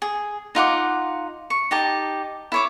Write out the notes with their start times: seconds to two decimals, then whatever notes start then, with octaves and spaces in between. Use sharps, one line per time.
0.02 G#4
0.55 D#4 F4 F#5 D6
1.50 C#6
1.71 D#4 G4 A5
2.52 E4 C#5 D6